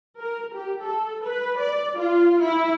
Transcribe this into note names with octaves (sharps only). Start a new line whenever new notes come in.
A#4
G4
A4
B4
D5
F4
E4